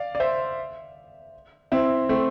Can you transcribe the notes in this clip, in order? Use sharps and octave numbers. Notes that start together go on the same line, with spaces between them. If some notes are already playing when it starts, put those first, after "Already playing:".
Already playing: D5 F5
D5
C5 E5
C4 E4
A3 C4